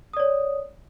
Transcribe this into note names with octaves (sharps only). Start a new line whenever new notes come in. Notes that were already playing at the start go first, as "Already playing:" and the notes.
C#5 D5 D#6